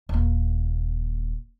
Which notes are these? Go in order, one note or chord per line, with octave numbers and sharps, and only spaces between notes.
D#1 A#3